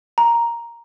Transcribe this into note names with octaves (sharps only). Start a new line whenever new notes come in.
A#5